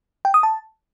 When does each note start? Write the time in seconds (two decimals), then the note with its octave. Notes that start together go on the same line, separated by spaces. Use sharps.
0.25 G5
0.34 D#6
0.43 A5